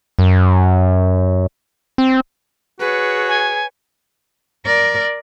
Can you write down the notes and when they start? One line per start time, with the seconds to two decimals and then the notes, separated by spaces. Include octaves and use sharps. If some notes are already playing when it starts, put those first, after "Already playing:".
0.19 F#2
1.98 C4
2.80 F#4 G#4 B4 C#5
3.28 G#5
4.66 A#4 D5